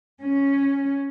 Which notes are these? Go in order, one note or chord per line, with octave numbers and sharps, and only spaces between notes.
C#4